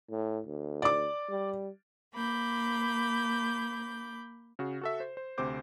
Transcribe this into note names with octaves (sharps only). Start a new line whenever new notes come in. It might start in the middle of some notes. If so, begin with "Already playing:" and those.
A2
D2
D5 D6
G3
A#3 B5 D6 G6
C#3 F#4
F#4 A4 E5
C5
C5
D2 C3 C4 C5 D6 G6